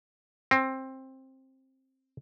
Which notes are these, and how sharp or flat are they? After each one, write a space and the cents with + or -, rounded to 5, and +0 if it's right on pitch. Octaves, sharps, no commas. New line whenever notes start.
C4 +15